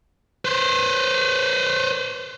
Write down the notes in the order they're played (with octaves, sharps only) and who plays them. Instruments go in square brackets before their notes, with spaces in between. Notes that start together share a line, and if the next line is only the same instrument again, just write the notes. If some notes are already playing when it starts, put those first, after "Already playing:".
[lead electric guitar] B4 C5